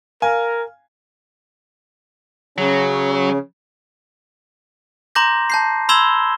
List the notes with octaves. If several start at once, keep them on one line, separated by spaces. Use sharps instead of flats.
A#4 F5 G#5
C#3 F#3 C#4
A#5 C6 D6 G6 A#6
A5 G6 C7
B5 C6 E6 G#6 E7 G7